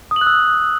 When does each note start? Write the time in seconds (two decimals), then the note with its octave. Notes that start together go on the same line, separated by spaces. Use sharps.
0.11 D#6
0.16 F#7
0.21 F#6
0.27 E6